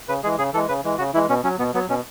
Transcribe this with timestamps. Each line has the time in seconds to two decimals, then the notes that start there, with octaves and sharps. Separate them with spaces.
0.08 C#3 B4
0.23 E3 G#3 G#4
0.38 C#3 G#4
0.53 E3 A4
0.56 G#3
0.68 C#3 B4
0.84 E3 G#3
0.98 C#3 F#4
1.14 E3 G#3 E4
1.29 B2 C#4
1.44 F#3 C#4
1.58 B2 B3
1.74 F#3 B3
1.89 B2 C#4